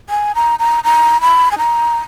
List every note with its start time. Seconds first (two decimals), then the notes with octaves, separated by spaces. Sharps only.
0.10 G#5
0.35 A#5
0.59 A#5
0.84 A#5
1.21 B5
1.51 G#5
1.58 A#5